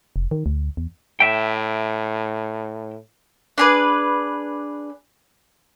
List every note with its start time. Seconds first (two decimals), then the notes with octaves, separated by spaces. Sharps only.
0.16 F1
0.31 D#3
0.46 D2
0.77 E2
1.20 A2 E5 G5
3.58 D4 G#4 B4